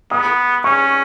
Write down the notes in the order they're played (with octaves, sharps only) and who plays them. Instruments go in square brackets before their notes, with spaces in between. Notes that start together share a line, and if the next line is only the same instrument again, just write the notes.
[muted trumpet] B3 [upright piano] D#6
[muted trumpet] C#4 [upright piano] C#6